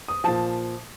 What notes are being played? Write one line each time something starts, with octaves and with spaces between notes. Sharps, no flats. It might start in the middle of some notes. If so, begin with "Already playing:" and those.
D#6
A#2 F3 A5